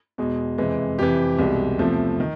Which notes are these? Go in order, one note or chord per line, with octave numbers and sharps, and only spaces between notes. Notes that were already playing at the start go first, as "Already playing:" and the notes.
E2 B2 G#3
F2 C3 E3 G#3
F2 C3 E3 G4
C2 B2 G#3
E2 C3 F3 A3
D#3